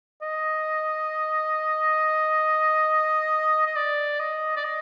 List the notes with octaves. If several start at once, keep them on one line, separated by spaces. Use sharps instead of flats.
D#5
D#5
D5
D#5
D5
D#5